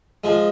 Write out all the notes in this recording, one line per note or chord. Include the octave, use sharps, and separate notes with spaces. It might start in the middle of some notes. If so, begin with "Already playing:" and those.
F3 G#3